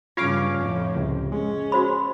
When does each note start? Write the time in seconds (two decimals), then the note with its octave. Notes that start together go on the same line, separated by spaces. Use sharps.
0.17 G2 C#3 F4 C#5 F5 D6
0.59 F2 A2
0.96 C#2 C3
1.32 G#3 C#4
1.72 F#4 C5 B5